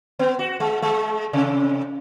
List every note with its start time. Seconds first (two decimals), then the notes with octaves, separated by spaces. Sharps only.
0.19 B3
0.39 F#4
0.60 G#3
0.82 G#3
1.33 C3